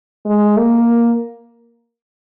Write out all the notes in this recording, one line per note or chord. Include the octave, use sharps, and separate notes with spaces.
G#3
A#3